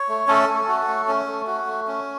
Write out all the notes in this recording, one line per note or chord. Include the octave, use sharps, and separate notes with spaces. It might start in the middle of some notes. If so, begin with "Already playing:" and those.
Already playing: C#5
A3
A3 C#4 A4
A3
F#4
A3
C#4
A3
F#4
A3
C#4